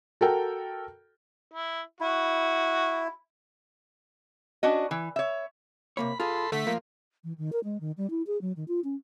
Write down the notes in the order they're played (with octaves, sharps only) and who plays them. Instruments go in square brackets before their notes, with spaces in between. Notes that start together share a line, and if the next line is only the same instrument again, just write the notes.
[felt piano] F#4 A4 A#4 G5
[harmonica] E4
[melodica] E4 [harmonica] F#4
[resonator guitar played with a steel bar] C#4 D4 F#4 D#5
E3
C#5 E5
[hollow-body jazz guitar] C3 A#3 C#5 [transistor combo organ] B5
[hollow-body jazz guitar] F4 G#4 [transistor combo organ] A4 B5 C6
[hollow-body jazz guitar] D3 [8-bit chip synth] A3 B6
[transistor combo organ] F3 [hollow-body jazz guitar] A#3 A#4
[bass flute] E3
D#3
A#4
G#3
D#3
G3
E4
G#4
F#3
D#3
F4
C#4